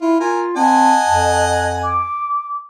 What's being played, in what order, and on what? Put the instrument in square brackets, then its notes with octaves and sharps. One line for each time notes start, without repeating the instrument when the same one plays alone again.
[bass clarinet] E4 [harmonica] F4
[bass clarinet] F4 [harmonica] A#4 G#5
[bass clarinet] C4 [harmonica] D#5 F#5 G#5 [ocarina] A5
[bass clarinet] F2
[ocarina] D6